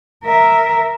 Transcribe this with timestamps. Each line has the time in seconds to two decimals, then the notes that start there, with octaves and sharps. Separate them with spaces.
0.24 A#4 E5